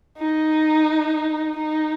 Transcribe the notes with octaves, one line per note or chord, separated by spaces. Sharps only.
D#4
D#4